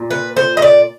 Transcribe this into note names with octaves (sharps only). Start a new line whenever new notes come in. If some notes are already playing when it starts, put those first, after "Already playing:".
Already playing: A#2
B4
C5
D#5
D5